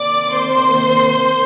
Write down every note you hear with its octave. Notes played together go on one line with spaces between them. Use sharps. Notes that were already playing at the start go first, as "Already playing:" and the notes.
Already playing: C3 D#3 A#3 D5 D6
C5 C6